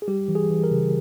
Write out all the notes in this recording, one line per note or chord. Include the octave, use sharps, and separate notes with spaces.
G#4
G3 G4
E3
G#4
E3
A#4
C#3